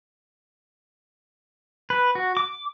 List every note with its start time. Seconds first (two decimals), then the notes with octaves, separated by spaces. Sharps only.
1.90 B4
2.15 F#4
2.37 D6